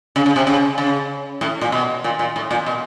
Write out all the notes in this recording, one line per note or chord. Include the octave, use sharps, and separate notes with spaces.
C#3
C#3
C3
C#3
C#3
A2
A#2
B2
A#2
A#2
A2
A#2
B2